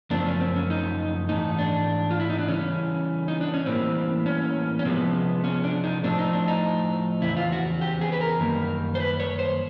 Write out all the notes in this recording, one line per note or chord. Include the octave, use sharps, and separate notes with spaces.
F#2 C#3 F3 A3 C4 D4
C#4
C4
C#4
D#4
G#2 E3 A3 D#4
D4
F4
E4
D#4
D4
C#3 E3 G3 C#4
D#4
D4
C#4
A2 E3 G3 A#3 C4
C#4
C#4
C3 F3 G#3 B3 C4
C#4
D4
D#4
A2 F3 A3 C4 D4
D#4
D4
D#4
E2 C#3 C4 E4
F4
F#4
G4
G#4
B4
A#4
F#2 D#3 G3 A#3
C5
B4
C#5
C5